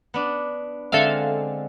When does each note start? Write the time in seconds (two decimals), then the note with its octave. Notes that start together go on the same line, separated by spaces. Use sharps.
0.14 B3 D4
0.92 D3 G#3 C4 A4 E5 F5